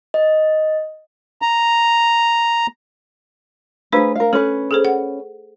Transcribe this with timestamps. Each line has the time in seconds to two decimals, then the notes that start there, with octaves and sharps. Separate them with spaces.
0.14 D#5
1.42 A#5
3.92 A3 D4 G#4 B4 C5
4.15 A#4 F5
4.33 C#4 A4 B4
4.71 G#4 A4 C5
4.85 F#5